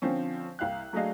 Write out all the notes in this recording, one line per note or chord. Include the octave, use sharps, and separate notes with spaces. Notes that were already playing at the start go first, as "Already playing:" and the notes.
D3 F3 C4 C#4
C2 F5 G5 F#6
F#3 A3 D4 G#4 D#5 F5